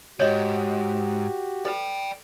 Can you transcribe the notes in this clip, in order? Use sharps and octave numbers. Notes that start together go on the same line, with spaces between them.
D2 G#2 F#4 G4 C#5 D#5
A4 B4 D5 G5